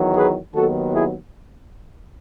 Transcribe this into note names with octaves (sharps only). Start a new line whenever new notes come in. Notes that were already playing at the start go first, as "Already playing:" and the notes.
Already playing: E2 D#3 F#3
G#4 B4
D#2 D#3 F#3 B3 F#4 A4
E4 G#4